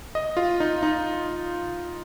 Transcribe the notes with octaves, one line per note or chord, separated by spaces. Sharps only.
D#5
F4
D#4
D#4